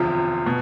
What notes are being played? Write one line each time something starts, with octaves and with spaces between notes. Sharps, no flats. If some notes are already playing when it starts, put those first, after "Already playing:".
Already playing: E1 D2 C3 F3 F4
B2